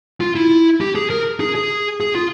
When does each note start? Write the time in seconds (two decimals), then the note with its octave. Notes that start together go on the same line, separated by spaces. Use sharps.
0.21 F4
0.35 E4
0.80 G4
0.95 G#4
1.10 A#4
1.40 G#4
1.55 G#4
2.00 G#4
2.15 F4